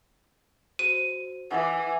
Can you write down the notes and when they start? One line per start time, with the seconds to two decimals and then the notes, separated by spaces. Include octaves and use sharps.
0.79 F#4 C5 D#7
1.51 E3 F#5 D6